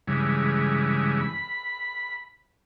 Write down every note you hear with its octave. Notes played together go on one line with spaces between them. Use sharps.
G2 C#3 E3 G#3
B5